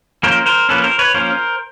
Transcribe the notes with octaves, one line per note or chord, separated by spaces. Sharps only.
F3 A#3 C#4 A#4 C5
A#4 C5
F3 A#3 C#4 A4 B4
A#4 C5
B4 C#5
F3 A#3 C#4 A#4 C5